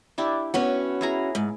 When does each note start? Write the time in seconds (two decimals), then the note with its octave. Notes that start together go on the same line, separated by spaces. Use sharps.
0.18 D4 E4 G4
0.54 B3 C#4 F#4 B4 C#5
1.01 E4 G#4 A#5
1.35 G#2